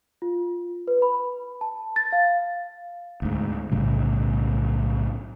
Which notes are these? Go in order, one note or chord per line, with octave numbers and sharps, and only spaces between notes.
F4
B4
B5
A5
A6
F5
D2 G#2
B1 A2 C#3 G3